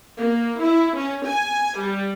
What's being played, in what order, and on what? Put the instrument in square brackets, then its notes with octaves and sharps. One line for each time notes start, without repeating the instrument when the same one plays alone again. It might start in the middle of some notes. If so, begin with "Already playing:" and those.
[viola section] A#3
E4
C#4
G#5
G3